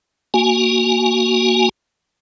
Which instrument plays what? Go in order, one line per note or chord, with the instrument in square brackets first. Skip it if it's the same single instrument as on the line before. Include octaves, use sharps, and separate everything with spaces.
[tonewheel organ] A#3 F#4 G#5